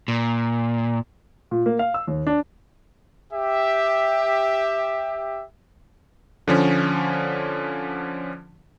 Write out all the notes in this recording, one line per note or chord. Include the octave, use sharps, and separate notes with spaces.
A#2
A#2
A#3
F5
E6
D#2
D4
G4 E5
D3 F3 C#4